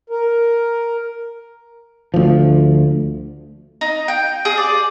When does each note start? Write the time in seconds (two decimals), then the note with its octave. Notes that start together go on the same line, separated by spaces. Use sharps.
0.10 A#4
2.14 D2 F3
3.81 D#4
4.08 G5
4.45 G#4
4.57 D5